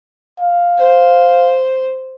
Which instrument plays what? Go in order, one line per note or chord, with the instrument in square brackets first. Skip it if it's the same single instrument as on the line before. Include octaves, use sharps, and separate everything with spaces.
[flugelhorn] F5
[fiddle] C5